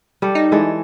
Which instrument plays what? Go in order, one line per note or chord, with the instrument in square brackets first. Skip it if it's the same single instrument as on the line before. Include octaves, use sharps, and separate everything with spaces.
[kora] G3 A4
[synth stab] D#4
[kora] E3 G#3 A4